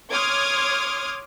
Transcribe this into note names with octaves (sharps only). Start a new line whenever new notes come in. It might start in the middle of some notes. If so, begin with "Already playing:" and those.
C#5 C6 D6 D#6 F6 G#6